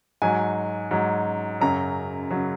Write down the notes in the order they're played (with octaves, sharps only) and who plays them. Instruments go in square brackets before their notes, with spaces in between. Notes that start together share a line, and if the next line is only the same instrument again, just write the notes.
[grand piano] G#2 F#3 G#5
G#2 F#3
F#2 C#3 F#3 A#5
C#3 F#3